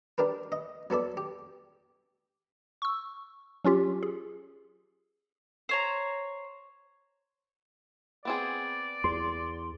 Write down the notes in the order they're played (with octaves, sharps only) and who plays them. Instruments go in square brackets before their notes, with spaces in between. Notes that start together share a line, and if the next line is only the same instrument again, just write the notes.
[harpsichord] D4 G4 A#4 B4
D#5
F#3 B3 A4 D5
G4
[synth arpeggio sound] C#6 E6
F#3 C#4 F4 G4
G#4
[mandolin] C5 C#5 A#5
[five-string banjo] B3 C4 G#4 [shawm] D5
[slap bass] E2 [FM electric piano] C6